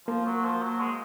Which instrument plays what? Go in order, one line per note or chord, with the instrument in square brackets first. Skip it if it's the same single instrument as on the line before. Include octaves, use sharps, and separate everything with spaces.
[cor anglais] F3 [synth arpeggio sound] A#3
[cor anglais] F#3
F3
F#3
G#3